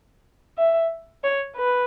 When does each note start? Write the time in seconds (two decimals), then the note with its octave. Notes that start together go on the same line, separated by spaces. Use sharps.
0.58 E5
1.24 C#5
1.57 B4